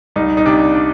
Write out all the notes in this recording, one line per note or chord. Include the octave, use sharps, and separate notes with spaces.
C2 D#4
D#4
C3 D4
D4